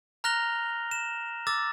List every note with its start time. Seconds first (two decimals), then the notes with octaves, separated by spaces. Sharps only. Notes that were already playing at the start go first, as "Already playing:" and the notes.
0.24 A#5 F6 F#6 A#6 F7 G7
0.91 E7
1.47 D6 E6 A6